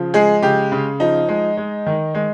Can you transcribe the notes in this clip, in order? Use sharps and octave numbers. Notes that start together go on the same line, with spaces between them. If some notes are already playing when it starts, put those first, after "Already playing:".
Already playing: C#3 F3
G#3 G#4
C#3 G4
C#3
F3 D#4
G#3
G#3
D#3
G#3